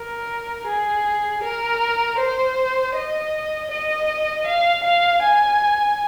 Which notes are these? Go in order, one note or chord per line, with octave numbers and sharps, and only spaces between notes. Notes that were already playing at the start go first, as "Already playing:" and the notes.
Already playing: A#4
G#4
A#4
C5
D#5
D#5
F5
F5
G#5